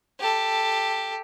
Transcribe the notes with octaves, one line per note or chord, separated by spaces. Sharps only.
G4 A4